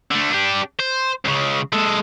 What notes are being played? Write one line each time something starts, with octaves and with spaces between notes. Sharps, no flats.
D3 A3
D4 G4
C5
C#2 C#3
G#3 A4